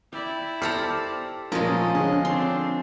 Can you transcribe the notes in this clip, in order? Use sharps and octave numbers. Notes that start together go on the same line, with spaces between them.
E4 D5 G5
G4 A4 C5 A#5 D6 F6 C#7
A1 A#2 F3 G#3 C#4 A#4 D#5 F5
D3 C#4 G#4
C4 D4 C6